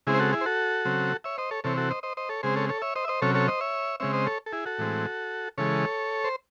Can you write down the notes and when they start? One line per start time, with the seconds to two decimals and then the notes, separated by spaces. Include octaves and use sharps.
0.07 C#3 G#3 C4 E4 G#4
0.14 C5
0.20 F#4 A4
0.33 E4 G#4
0.41 C5
0.46 F#4 A4
0.85 C#3 F#3 C4
1.24 C#5 E5
1.38 C5 D#5
1.51 A4 C#5
1.64 C3 E3 C4 A4 C#5
1.77 F#4 A4
1.91 C5 D#5
2.03 C5 D#5
2.17 C5 D#5
2.29 A4 C#5
2.43 C#3 G#3 C4 G#4 C5
2.56 A4 C#5
2.69 A4 C#5
2.82 C#5 E5
2.96 C5 D#5
3.05 E5
3.08 C5 D#5
3.22 C3 F#3 C#4 A4 C#5
3.35 A4 C#5
3.48 C5 D#5
3.61 C#5 E5
4.00 C#3 G#3 C4 C#5 E5
4.13 C5 D#5
4.26 A4 C#5
4.46 A4
4.53 E4 G#4
4.66 F#4 A4
4.79 A2 E3 G#3 C4
5.58 C#3 E3 G#3 A4 C#5
6.24 C5